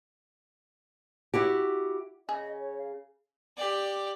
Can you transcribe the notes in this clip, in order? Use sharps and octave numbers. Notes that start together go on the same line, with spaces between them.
E4 F#4 G4
C#3 G#4 D#5 G#5
C#5
F5
G4 D5